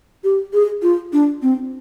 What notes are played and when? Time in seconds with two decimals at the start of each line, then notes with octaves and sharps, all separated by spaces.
0.24 G4
0.53 G#4
0.82 F4
1.13 D4
1.42 C4